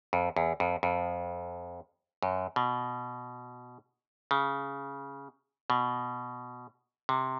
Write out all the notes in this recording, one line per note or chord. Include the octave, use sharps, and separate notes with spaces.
F2
E2
F2
F2
F#2
B2
C#3
B2
C3